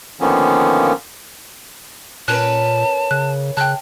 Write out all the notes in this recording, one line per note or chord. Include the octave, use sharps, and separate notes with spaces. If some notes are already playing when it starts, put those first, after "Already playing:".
D3 D#3 F3 A#3 B3 C#4
A#2 C#4 A#4 B4 A5 F#6
C#3 F#6
C#3 G5 A5 F#6